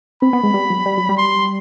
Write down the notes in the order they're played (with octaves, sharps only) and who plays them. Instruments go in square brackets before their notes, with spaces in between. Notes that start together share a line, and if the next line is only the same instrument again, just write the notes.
[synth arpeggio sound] C4 [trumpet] B5
[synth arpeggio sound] B3
G#3
G3
F#3
G3
F#3
G3
[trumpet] C6